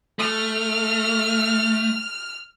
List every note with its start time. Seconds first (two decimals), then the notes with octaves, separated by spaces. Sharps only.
0.19 A3 F6